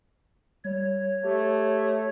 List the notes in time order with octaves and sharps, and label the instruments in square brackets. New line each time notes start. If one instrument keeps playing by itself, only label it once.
[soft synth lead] G3 [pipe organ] C#5
[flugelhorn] A3 [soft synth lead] G4